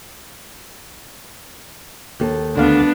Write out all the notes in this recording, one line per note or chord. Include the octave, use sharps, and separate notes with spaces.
D#2 A4
D2 D3 B3 D4 F5